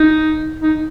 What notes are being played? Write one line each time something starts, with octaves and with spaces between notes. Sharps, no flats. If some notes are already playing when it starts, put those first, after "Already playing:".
Already playing: D#4
D#4